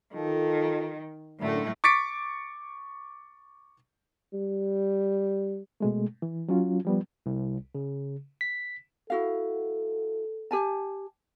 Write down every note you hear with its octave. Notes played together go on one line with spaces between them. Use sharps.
D#3 F4 A4
F#2 A2 D3 A3
C#6 D6 A6 B6 C#7 D7
G3
B2 G#3 A3
E3
F#3 C#4 F4
F3 G3 B3
C2
C#3
B6
E4 F#4 A4 F5
G4 G#5 A5